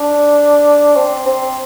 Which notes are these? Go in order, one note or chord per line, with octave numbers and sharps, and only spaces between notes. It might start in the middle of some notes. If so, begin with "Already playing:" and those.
Already playing: D4
C4
C4